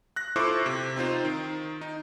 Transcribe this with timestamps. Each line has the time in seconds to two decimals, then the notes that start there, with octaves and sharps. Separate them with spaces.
0.16 F#6 A#6
0.36 E4 F4 A4 C5 C#6 D6
0.66 C3
0.96 C4 D#4 F4 C5
1.25 D#3
1.81 D#4